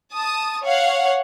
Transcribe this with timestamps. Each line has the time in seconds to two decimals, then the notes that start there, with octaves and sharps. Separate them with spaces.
0.14 A5 D#6
0.63 C#5 F5 F#5